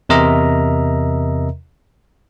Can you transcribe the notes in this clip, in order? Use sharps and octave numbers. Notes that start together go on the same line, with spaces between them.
E2 C3 A#4 D#5 E5 A#5